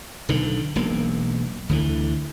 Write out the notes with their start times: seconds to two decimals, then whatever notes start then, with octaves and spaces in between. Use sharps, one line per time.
0.29 B1 D3 D#3
0.76 E1 B1 A#3
1.69 D2 D3 E3